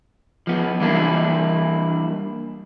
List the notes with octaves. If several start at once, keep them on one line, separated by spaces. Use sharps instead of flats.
F3 B3
E3 G3 A#3 D4 E4